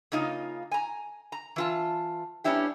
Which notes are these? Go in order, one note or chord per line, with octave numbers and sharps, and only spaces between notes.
C#3 A#3 D#4 F4
G#5 A#5
A#5
E3 F4 A5
G3 B3 C#4 D4 E4 G4